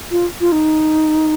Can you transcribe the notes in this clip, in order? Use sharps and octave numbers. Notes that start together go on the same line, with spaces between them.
F4
F4
D#4